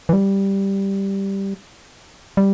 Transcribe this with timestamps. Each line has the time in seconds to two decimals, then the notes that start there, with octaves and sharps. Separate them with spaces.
0.09 E3
0.13 G3
2.37 G3